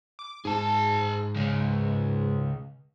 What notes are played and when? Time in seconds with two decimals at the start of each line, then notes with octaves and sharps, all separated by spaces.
0.19 D6
0.45 G#2 G#4 A5
1.36 C#3 G#3